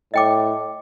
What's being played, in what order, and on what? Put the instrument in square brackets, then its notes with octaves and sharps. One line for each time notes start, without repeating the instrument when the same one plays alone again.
[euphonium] A2 [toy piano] D#5 G5 D6